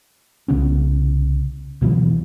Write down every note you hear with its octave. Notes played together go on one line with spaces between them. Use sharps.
C2 C#3 B3 C#4
D2 B2 E3 F#3